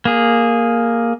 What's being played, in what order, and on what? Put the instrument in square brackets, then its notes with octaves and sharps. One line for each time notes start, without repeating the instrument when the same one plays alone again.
[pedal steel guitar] A#3 G#4